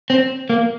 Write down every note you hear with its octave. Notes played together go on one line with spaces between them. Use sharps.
C4
A#3